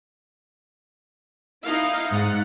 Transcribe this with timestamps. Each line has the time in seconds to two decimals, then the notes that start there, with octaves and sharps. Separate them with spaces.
1.65 D#4 E4 F5
2.11 G#2 F#5